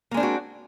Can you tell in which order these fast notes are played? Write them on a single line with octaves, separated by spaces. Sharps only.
A#3 G#3 D4 C4 F#4